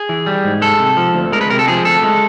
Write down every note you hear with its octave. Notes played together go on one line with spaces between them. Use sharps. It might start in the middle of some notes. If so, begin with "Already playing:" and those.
Already playing: G#4
E3
G3
G#2
G#3 A4
C3
F3
D2
G#3 A#4
B4
C3 A#4
A4
F3 G#4
D2 A4
G#3